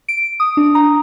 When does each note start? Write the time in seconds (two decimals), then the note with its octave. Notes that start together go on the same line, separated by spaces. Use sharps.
0.09 D7
0.40 D#6
0.57 D4
0.75 A#5